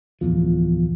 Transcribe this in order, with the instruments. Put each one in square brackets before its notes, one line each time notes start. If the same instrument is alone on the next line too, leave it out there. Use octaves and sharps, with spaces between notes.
[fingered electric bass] D1 G#1 E2 F3